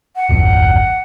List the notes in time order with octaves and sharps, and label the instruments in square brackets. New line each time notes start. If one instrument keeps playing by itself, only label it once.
[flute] F#5
[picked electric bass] D1 G#1 F2